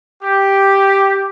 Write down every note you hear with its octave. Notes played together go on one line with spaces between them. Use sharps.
G4